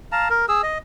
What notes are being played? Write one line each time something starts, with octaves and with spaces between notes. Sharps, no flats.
F5 A5 A#5
A#4
G#4 E6
D#5